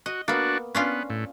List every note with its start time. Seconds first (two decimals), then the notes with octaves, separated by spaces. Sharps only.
0.06 F#4 D#5
0.28 A#3 B3 D4 F#4
0.75 B3 C#4 D4 F4
1.10 A2